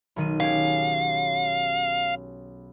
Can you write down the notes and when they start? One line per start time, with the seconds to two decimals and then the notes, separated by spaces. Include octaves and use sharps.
0.16 B1 D#3 D#7
0.40 C#4 G4 G#4 F5